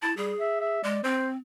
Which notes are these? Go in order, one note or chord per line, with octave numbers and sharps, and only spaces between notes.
E4 A5
G3 G#4
E5
E5
G#3 D5
C4 C5